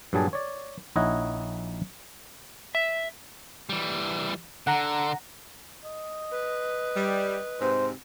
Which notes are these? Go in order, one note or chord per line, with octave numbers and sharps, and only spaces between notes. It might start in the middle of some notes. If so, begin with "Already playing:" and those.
G2 A#2 F#3 G3 G#4 A5
C#5 D5
A#1 D#4 E4 C#5 D#5 F#5
E5
E3 G3
D3 F#5 A#5
D#5
B4
G3
G#2 C3 C4 C5